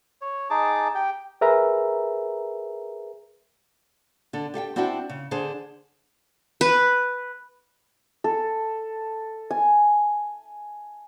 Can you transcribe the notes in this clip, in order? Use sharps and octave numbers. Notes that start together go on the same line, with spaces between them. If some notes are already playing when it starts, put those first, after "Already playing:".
C#5
D#4 G#4 A5 D6
G4 G5
G#4 A#4 B4 E5 A#5
D3 A4
G4 A4 F5 G5
C4 D4 E4 F#4 C5 G5
C#3
D3 G#4 C5 A5
B4
A4
G#5